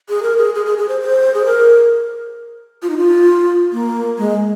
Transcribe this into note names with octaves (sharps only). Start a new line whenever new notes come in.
G#4
A#4
G#4
G#4
G#4
G#4
C5
C5
G#4
A#4
F4
D#4
F4
A#3
G#3